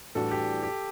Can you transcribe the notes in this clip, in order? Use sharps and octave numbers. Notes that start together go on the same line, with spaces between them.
A2 E3 G3 D4 F#4 A4
G4
G4